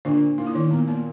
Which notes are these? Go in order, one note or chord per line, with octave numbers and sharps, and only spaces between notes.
A#2 D3 D4
A#2 D#4
E4
D#3 D#4
A#2 B3
A#3